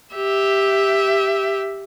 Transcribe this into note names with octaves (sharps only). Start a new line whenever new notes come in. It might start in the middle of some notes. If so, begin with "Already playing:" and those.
G4 E5